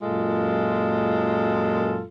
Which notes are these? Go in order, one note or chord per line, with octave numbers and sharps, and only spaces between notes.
F#2 A#2 G#3 F4 A4